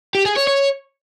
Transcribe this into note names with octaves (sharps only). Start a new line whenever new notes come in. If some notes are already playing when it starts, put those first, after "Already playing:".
G4
G#4
C#5
C#5